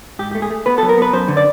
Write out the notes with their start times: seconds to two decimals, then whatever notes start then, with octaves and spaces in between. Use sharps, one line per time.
0.19 G#2 G4
0.31 A3 G4
0.42 G#4
0.50 A3
0.66 B3 B4
0.78 F#3 A4
0.89 A#4
0.98 B3 B4
1.13 F#2 C5
1.28 D3
1.37 D5